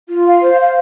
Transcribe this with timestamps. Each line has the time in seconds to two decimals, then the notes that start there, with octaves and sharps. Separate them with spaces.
0.08 F4
0.25 F5
0.42 C5
0.59 F5